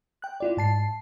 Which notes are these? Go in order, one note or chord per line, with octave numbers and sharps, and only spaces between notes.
G5 F#6
E4 F4 D5
G#2 A5 C7